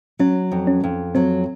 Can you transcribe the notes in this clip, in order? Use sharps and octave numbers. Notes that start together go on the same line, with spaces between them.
F#3 C#4
F2
C#4
F2
F#3 C4